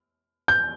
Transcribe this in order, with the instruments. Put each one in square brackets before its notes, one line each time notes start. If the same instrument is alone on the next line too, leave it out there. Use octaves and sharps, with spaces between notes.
[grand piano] G6